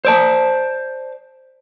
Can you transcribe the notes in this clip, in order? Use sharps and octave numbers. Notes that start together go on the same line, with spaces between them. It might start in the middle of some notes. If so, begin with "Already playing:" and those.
C5 D5 A5